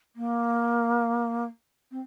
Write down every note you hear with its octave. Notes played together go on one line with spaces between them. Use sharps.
A#3
C4